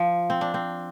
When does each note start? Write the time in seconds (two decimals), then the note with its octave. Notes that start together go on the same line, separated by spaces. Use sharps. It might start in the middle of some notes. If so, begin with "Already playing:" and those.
Already playing: F3
0.30 C4
0.41 D4
0.54 C4